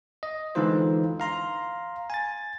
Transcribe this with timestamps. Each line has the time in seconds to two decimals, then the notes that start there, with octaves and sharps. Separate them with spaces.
0.23 D#5
0.55 D3 E3 G#3 D#4 F4 C5
1.20 F5 A#5 C6
2.10 G#5 A6